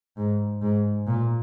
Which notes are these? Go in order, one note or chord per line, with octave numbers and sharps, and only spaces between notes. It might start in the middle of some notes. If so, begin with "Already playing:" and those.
G#2
G#2
A#2